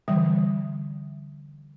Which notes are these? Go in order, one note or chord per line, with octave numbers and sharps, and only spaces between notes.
D3 E3 G3 E5 D#6